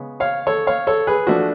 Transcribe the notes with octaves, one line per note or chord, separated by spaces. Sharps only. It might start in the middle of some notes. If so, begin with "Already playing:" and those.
Already playing: C#3 G#3 B3
C#5 F5
A4 C#5
C#5 F5
A4 C#5
G#4 B4
F3 A3 D4 F#4